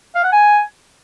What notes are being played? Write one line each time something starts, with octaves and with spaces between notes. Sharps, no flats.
F5
F#5
G#5